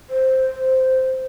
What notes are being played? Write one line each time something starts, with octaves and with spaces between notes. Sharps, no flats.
C5